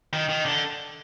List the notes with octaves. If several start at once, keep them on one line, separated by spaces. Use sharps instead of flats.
D#3
D#3
D3